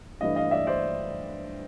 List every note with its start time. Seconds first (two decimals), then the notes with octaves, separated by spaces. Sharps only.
0.20 G2 E3 A3 D4 D#5 F5
0.36 D#5 F5
0.51 D5 E5
0.67 C5 D5